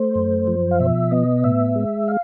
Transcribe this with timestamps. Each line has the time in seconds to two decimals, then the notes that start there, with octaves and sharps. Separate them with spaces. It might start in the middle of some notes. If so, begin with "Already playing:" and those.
Already playing: A3 C5
0.15 F#2
0.47 F3
0.71 F5
0.80 B2 E5
1.11 B3 D#5
1.44 A2 E5
1.76 G#3
2.08 F5